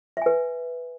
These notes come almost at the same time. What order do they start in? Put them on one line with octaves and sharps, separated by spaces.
E5 G#5 B4